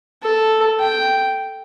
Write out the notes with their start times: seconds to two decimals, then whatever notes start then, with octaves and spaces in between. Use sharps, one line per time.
0.23 A4
0.80 G5